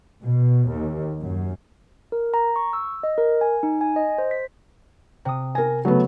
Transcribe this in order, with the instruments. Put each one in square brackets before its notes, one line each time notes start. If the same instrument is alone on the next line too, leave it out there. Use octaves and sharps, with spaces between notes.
[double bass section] B2
D#2
F#2
[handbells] A#4
A#5
C#6
E6
D#5
A#4
G#5
D#4
G#5
D#5
C5
B6
[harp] C3 D#6
[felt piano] A#4 G#5 [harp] A#6
[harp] C#3 [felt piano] F#3 A3 B3